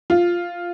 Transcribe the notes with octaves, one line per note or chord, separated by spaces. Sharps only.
F4